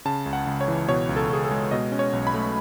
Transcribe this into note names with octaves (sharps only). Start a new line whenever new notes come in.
C#3 A5
C#2
F#5
C#2
C#5
E3
B2 C#5
C#2
A4
C#2 G#4
A4
G#3
B2 D#5
C#4
C#5
B1
B5
A3